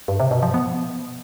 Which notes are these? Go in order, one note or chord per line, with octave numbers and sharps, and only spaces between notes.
G2
C3
B2
F3
B3